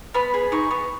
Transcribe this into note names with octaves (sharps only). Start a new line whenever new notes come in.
B3 B5
G#4
D#4 C#6
B3